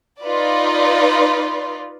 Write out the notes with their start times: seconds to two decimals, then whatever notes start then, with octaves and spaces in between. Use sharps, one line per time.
0.22 D#4 F4 B4 D5